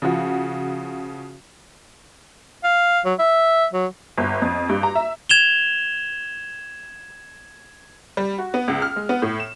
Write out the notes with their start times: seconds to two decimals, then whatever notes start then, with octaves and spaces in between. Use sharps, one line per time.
0.02 C#3 F3 F#4
2.64 F5
3.05 F#3
3.19 E5
3.73 F#3
4.17 G1
4.42 F2
4.69 G2
4.83 A#5
4.95 E5
5.29 G#6 E7 F7 G7
8.17 G3
8.38 F#4
8.54 B3
8.68 C#2
8.82 F6
8.96 G#3
9.09 B3
9.22 A2
9.40 E7